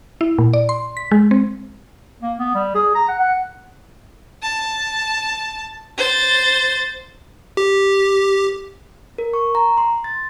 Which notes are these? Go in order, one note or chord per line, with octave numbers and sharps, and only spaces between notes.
E4
A#2
D5
C6
B6
G#3
C4
A#3
B3
G3
G#4
A#5
F#5
F#5
A5
C5 A6
G4
A#4
C#6
A#5
C6
A6